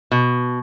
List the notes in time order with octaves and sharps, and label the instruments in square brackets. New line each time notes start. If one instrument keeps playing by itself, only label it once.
[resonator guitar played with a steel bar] B2